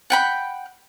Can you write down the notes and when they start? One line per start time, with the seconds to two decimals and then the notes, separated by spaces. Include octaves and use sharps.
0.10 F#5 G5 B5